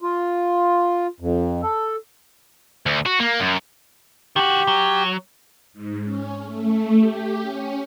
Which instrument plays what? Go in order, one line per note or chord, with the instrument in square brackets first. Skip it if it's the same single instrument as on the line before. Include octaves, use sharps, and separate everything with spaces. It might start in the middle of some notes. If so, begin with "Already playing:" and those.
[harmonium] F4
F2
A4
[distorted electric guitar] D2
F#4
A#3
F#2
[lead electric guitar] D#3 F#4 [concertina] G4
[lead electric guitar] F#3
[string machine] G#2
C#4
A3
G4
C#4